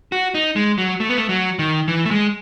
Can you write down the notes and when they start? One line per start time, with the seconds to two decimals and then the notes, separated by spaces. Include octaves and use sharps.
0.12 F#4
0.35 D#4
0.56 G#3
0.78 F#3
1.00 A3
1.09 B3
1.17 A3
1.29 F#3
1.59 D#3
1.88 E3
2.05 A3
2.11 G#3